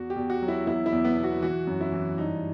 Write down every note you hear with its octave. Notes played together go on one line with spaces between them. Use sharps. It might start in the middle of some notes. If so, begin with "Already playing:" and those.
Already playing: E2 F#4
G4
E2
F#4
F#3
E4
E2 E4
E4
E2
B3
B2
F#4
E3 F#4
F#2
E4
E3
G2 D#4